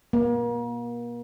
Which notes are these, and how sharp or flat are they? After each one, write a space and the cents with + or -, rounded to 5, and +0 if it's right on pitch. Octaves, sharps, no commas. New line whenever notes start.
A#3 +35